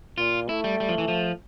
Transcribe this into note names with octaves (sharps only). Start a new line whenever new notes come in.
A#2 F4
A3 E4
G3
G3
F3
E3
F3